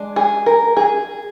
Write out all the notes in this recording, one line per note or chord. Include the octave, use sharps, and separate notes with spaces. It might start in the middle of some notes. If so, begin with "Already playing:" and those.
Already playing: G#3 D4
G#4
A#4
G#4